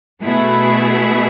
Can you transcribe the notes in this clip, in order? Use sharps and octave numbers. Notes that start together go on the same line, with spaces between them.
B2 A3 E4 G#4